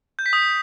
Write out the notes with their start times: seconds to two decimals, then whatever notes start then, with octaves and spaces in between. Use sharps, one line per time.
0.19 G6
0.26 B6
0.33 D#6